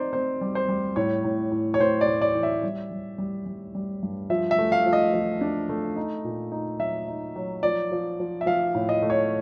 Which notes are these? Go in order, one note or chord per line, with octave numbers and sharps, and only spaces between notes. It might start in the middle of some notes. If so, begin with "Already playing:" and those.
Already playing: C4 D#4 C5 D5
C4 C5
G3
C5
G3
A2 C#5
A2
A2
C#5
A2 C5
D5
A2
D5
E3
E5
G3
G3
G3
G3
G3
G2
F3 E5
E5
A3
F5
F3
D#5
F3
D4
A3
D#4
A#2
D#4
F#3 E5
D#4
F#3
F3 D5
F3
F3
E5
F3 F5
A2
D#5
A3
C#5